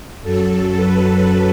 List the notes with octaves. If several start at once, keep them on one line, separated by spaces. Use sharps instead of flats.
F#2 F#3 A4
B4